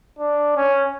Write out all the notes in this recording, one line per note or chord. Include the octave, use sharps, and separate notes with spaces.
D4
C#4